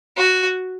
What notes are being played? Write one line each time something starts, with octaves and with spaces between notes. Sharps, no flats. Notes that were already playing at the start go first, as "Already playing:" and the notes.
F#4